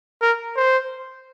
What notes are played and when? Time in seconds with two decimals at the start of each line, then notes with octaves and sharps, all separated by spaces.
0.21 A#4
0.57 C5